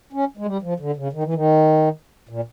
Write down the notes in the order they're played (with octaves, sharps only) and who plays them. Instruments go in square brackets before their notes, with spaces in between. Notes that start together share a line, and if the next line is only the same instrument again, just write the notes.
[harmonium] C#4
G#3
G3
F3
D3
C#3
D#3
E3
D#3
A#2